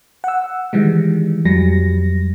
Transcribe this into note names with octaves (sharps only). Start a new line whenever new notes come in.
F#5 E6
D#3 E3 G3 G#3
F2 F#3 G3 A#6